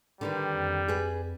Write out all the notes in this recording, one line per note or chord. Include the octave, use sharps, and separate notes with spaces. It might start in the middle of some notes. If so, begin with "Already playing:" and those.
D3 D#3 G3 B4
F2
G#4 B4